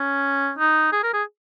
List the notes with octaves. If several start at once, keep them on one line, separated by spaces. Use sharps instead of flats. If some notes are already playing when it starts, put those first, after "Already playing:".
Already playing: C#4
D#4
G#4
A#4
G#4